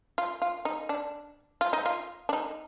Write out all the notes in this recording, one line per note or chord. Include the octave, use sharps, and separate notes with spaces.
F4
F4
D#4
D4
F4
D#4
F4
D4
D#4